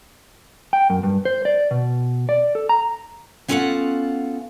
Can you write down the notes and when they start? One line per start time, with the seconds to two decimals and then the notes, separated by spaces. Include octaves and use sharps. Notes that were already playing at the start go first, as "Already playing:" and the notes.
0.73 G5
0.90 F#2
1.03 G2
1.25 C5
1.45 D5
1.71 B2
2.29 D5
2.55 A4
2.69 A#5
3.48 B3 C#4 F4 A4 F5 F#5